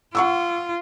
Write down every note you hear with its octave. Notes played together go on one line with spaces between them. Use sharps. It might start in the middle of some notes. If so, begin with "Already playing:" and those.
F4 F#5 C#6 E6